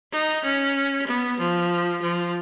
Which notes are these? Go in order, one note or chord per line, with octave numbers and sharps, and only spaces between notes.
D#4
C#4
B3
F3
F3